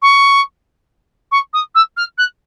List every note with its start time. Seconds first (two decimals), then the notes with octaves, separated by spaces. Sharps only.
0.02 C#6
1.31 C#6
1.53 D#6
1.74 E6
1.96 F6
2.17 F#6